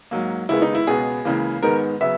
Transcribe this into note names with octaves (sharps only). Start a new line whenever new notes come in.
G#2 F#3 A#3
D#2 C#3 G#3 B3 E4
D#4
E4
C#2 B2 G#3 B3 G#4
C#2 C#3 E3 A#3
G#2 D#3 G#3 B3 A#4
C#3 F#3 B3 E5